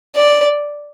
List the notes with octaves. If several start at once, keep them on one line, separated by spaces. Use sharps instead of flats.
D5